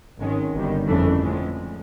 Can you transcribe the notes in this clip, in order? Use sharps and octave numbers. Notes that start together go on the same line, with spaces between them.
G#1 G#2 D#3 G#3 C#4
G1 G2 D#3 G3
F2 C#3 E3 A3 D4
A2 F3 G#3